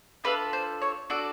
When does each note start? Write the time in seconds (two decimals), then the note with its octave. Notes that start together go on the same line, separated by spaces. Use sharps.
0.24 D4 F4 A4 B4
0.53 C5
0.82 C#5
1.10 D4 F#4 A4 D5